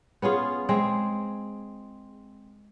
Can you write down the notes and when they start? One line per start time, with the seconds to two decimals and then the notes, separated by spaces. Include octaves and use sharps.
0.22 B3 C#4 F4 G#4
0.69 G#3 C4 G#4